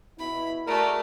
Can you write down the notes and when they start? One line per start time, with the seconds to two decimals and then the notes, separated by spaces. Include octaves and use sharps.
0.19 B2 E4 B5
0.67 A3 F#4 G#4 A#4 D5